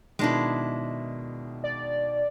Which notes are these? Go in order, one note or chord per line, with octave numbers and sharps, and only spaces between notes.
B2 D#3 G#3 D4 E4
D5